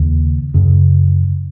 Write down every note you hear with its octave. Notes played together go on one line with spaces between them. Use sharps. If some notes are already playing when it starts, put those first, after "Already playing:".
Already playing: D#2 C#3
F#2 C#3